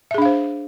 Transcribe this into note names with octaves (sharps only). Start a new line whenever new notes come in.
D4 G#4 C5 E5 F5